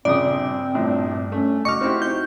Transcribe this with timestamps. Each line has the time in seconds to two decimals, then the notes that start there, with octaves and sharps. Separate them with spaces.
0.05 A#1 G2 C#3 C4 D5 D#6
0.75 A#1 A2
1.32 A3 C#4
1.65 F#1 F#4 D#5 C#6 D6 F6
1.81 C4 D#4 E4 G4
2.02 G6